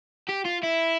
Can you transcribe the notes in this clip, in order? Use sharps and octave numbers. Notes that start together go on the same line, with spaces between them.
G4
F4
E4